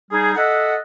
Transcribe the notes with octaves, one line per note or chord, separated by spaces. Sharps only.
G3 D#4 G#4
A4 D#5 E5 F#5